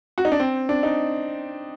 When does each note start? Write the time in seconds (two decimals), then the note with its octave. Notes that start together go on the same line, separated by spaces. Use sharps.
0.18 F#4
0.25 D#4
0.32 D4
0.40 C4
0.69 D4
0.83 D#4